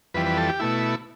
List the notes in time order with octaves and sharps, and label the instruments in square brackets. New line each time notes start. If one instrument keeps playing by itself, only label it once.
[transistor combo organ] F2 E3 G3 B4
B4
A4
G4
B2 A3 E4